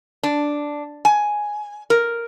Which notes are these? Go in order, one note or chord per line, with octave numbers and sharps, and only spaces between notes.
D4
G#5
A#4